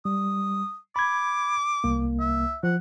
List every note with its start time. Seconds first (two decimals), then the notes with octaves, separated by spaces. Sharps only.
0.05 G3 D#6
0.96 B5 D6 G#6
1.84 C2 A#3
2.20 E5
2.63 F3 F#5